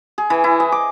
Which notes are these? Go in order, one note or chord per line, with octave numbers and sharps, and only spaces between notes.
G#4
E3
E4
D#5
D6